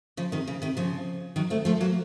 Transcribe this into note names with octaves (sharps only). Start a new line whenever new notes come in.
C#3 F3
C3 D#3
C#3
C3 D#3
C#3 F3
D#3 F#3
A3 C4
F3 A3
F#3 A#3